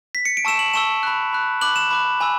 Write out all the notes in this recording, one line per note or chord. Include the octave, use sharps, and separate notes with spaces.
B6
C#7
D7
A5 C#6 E6 E7
F#7
A5 C#6 E6 E7
B5 F#6
B5 F#6
B5 D6 F#6 F#7
E7
B5 D6 F#6
G#5 B5 E6